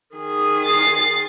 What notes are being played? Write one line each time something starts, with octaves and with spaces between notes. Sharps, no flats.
D#3 G#4
A6 C7